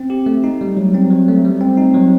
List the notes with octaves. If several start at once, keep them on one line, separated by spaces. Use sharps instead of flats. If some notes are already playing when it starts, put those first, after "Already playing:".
Already playing: C4
G4
A3
D#4
G3
F#3
C4
F#3
A3
G3
C4
D#4
F#3